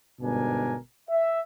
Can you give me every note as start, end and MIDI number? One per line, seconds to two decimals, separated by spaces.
0.21 0.77 31
0.21 0.77 44
0.21 0.77 47
0.21 0.77 62
0.21 0.77 70
0.21 0.77 80
1.09 1.41 76